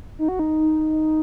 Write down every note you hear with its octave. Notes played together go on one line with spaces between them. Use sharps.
D#4
F#4
D#4